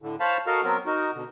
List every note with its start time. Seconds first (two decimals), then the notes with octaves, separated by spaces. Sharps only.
0.02 A2 D3
0.20 C5 C#5 F5 A5 B5
0.47 F#4 A4 A#4 D#5 F5
0.64 F#3 B3 C4 A#4
0.86 D#4 F#4 A#4
1.14 B2 D3